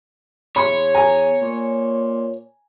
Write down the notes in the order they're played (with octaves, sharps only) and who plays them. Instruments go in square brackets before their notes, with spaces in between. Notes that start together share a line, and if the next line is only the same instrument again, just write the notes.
[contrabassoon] E2 [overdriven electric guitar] C#5 [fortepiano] B5 C6
[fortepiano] G#5 A#5
[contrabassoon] A#2